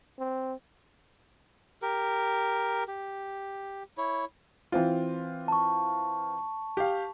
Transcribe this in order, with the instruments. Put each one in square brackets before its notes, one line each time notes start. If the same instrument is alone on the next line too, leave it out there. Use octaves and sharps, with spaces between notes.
[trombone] C4
[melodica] G4 A#4
G4
E4 C#5
[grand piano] E3 C4 F4
[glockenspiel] A5 C#6
[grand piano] G4 F5